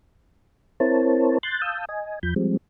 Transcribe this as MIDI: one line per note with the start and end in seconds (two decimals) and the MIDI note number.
0.80 1.38 60
0.80 1.38 64
0.80 1.38 70
0.80 1.38 72
0.80 1.38 73
0.80 1.38 81
1.43 1.61 84
1.43 1.61 90
1.43 1.61 91
1.43 1.61 93
1.62 1.85 77
1.62 1.85 81
1.62 1.85 87
1.62 1.85 88
1.62 1.85 91
1.89 2.19 75
1.89 2.19 80
2.23 2.34 40
2.23 2.34 53
2.23 2.34 83
2.23 2.34 91
2.36 2.57 53
2.36 2.57 55
2.36 2.57 56
2.36 2.57 60